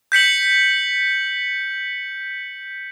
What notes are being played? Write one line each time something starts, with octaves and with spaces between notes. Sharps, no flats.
G6 B6 C#7 F#7